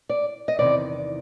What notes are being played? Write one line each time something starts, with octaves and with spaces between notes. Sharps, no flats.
D5
D#5
E2 C3 D#3 D5